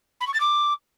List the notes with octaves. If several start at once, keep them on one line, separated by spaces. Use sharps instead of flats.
B5
C#6
A6
D6